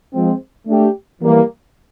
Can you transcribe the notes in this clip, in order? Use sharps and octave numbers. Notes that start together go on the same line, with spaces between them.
F3 G#3 C4
A3 D4 G4
E3 G3 A#3